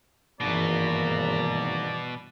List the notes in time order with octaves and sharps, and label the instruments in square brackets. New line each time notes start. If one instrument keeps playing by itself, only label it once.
[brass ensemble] G#1 A#3 A#5 [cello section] G2 E3 [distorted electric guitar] B2 [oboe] D5